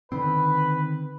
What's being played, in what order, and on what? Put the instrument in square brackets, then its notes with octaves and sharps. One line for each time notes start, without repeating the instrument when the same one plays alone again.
[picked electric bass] D3 D#3 C4 [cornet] B4